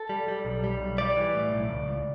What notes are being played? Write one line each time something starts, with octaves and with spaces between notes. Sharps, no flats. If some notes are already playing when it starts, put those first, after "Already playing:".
Already playing: A4
G3
G3
B1
G3
B1
G3 D5
E3
A2
B1
C#2
C#2